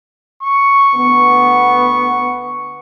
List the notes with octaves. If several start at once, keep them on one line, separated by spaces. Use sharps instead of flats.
C#6
D2 B3